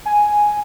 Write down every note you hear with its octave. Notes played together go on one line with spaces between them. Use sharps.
G#5